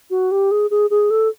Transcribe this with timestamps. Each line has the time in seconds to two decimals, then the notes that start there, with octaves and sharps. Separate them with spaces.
0.10 F#4
0.31 G4
0.51 G#4
0.71 G#4
0.90 G#4
1.11 A4